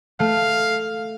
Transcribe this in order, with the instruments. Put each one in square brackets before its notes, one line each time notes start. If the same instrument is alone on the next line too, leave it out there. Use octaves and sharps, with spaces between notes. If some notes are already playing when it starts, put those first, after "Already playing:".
[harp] A3 [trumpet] F5